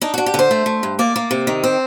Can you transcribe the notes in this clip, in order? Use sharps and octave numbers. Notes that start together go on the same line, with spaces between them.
D4 D#4
D4 F#4
G4
D3 C5
A3
A3
G2
A#3 D5
A#3
C3
D#3
C4